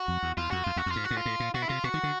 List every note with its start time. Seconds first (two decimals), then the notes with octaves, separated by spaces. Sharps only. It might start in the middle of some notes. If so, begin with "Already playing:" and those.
Already playing: F#4
0.08 F2
0.23 E2
0.37 E2 F4
0.51 F2 F#4
0.64 F2 F4
0.76 E2 F#4
0.86 F2
0.91 F4
0.96 G#2
1.04 F#4
1.11 A2
1.17 F4
1.26 A2
1.40 A#2
1.54 B2 F#4
1.62 E4
1.69 C3 F4
1.84 B2 F#4
1.94 D#3
2.03 D3